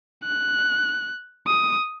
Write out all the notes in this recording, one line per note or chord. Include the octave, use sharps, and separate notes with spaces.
F#6
D#6